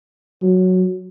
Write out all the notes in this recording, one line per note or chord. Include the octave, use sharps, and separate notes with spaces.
F#3